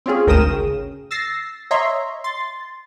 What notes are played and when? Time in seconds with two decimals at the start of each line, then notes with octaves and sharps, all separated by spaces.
0.06 C4 C#4 F4 G#4
0.27 G#1 D2 A#4 G5 D#6 E7
0.50 C#3
1.11 E6 A6 A#6 C7
1.71 C#5 D#5 E5 A#5 C6
2.24 C6 A6